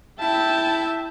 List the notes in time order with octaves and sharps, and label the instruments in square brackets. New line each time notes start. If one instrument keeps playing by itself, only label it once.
[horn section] E4 E5 [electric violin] G5 A5